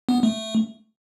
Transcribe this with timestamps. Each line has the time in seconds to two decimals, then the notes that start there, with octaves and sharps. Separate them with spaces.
0.09 B3
0.23 A3